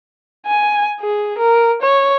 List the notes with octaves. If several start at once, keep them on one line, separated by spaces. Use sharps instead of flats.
G#5
G#4
A#4
C#5